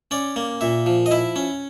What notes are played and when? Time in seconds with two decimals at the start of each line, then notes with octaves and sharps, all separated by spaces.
0.11 C#4 D5
0.36 A#3
0.61 A#2 E5
0.86 F3
1.06 D#5
1.11 E4 E5
1.36 C#4